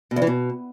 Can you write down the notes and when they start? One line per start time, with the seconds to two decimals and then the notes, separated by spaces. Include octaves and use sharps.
0.11 B2
0.16 E2
0.22 E3
0.27 B2